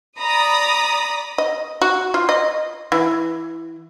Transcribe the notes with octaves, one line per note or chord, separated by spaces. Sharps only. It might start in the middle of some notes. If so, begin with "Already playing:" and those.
D5 A#5 B5 D#6
D#5
F#4
F4
D#5
E3